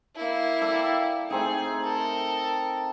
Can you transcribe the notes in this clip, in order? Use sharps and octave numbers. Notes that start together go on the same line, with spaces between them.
A#3 E4
A4 D5 G5
A3 C4 D#4 G#4
A4 A#4